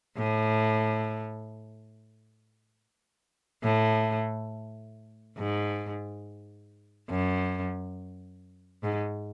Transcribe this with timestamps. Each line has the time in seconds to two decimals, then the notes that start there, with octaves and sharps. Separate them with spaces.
0.17 A2
3.64 A2
5.38 G#2
7.10 F#2
8.84 G#2